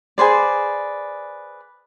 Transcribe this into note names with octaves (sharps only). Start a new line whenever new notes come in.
G#4 B4 C5 D5